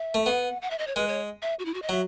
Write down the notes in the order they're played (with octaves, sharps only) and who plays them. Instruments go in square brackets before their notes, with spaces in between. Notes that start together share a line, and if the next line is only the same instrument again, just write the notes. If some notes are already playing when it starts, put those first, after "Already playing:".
Already playing: [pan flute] E5
[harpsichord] A3
[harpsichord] B3 [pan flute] F#5
[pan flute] F#5
E5
D#5
C#5
[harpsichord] G#3 [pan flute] B4
[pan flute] C#5
E5
F#4
E4
F#4
D#5
[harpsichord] F#3 [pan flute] E5